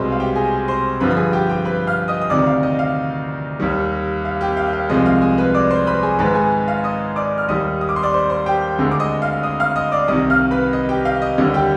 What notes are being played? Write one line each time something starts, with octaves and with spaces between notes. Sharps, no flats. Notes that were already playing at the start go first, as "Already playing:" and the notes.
Already playing: C2 B2 G#3 C5 D#5 B5 C6
F5
G4 G5
G#4 G#5
C5 C6
G2 D3 F3 B4 B5
B5
G#4 G#5
G4 G5
G4 G5
B4 B5
F5 F6
D#5 D#6
D#6
D2 C3 D#3 D5 D6
F5
D#5
F5
D#2 D#3 G3
F5
G4 G5
F5
F5
C2 C3 F3 G#3 D#5
F5
G#4 G#5
B4 B5
D5 D6
C5 C6
B4 B5
G#4 G#5
G#2 D#3 G#3 B4 B5
G#4 G#5
F5
D#5 D#6
D5 D6
F6
D#2 D#3 G3 D#5 D#6
D#6
D6
C6
D5 D6
C5 C6
C5 C6
G4 G5
D2 D3 G#3
D6
D#5 D#6
F5 F6
D#5 D#6
F5 F6
D#5 D#6
D5 D6
C2 C3 D#3 D#5 D#6
F5 F6
B4 B5
D#5
G4 G5
F5
D#5
D#2 D3 G3 D#5
G4 G5